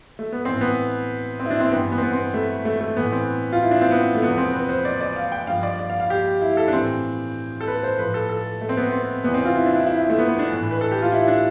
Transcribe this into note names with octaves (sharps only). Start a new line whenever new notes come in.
A3
B3
A2 E3 C4
B3
C4
E4
D4
C4
G2 E3 B3
B3
C4
B3
C4
A3
A3
A3
A2 E3 B3
C4
F4
E4
D4
C4
B3
A3
E2 C3 F3 B3
C4
B4
C5
D5
D5
F5
G5
G2 F3 F5
D5
D5
F5
F5
G4
E4
A4
D4
A2 E3 C4
A4
B4
C5
A2 F3 B4
A4
A4
A3
C4
B3
C4
E2 C3 E3 B3
C4
F4
E4
D4
E4
E4
A3
B3
B3
D4
A2 E3
B4
A4
G4
F4
E4
D4